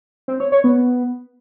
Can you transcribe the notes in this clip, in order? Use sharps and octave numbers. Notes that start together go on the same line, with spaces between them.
C4
C#5
C#5
B3